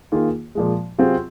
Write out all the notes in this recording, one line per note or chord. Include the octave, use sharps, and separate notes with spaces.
D#3 A#3 F4 G#4
A#2 F3 G#3
C3 F#3 C4 F4 G#4